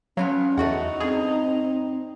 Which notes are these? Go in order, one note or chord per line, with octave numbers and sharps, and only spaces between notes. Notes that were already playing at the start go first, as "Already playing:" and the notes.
F3 F#3 B3 C#4 F5
E2 A3 D#4 F#4 F#5
G2 C4 G#4